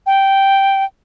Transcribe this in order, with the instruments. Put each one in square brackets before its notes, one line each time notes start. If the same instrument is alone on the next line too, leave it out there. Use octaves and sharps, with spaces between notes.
[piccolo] G5